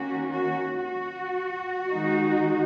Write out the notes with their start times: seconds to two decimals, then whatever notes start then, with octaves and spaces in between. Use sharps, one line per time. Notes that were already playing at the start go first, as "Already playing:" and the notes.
Already playing: D#3 A#3 C#4 F#4
0.32 F#4
0.85 F#4
1.91 D#3 G#3 D#4